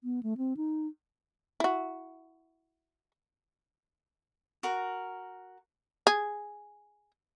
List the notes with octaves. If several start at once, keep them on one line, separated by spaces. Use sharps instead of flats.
B3
A3
C4
D#4
E4 F#4
F#4 A#4
G#4